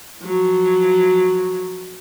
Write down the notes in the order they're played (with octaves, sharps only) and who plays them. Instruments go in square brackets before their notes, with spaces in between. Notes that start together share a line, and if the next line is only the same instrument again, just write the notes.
[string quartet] F3 F#3